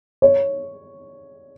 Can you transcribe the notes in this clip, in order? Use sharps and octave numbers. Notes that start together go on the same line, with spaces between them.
C#5